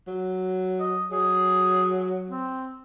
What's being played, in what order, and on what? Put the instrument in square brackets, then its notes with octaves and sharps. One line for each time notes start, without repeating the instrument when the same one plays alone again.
[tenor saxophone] F#3
[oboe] D#5
[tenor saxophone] F#3 [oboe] G#4
[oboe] C4